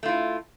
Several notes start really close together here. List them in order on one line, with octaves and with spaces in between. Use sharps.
A3 F4 E4